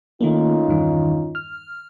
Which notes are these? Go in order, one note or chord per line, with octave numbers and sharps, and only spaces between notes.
D#3 A3 A#3 C#4 D#4 F4
E2 G2 D#3
F6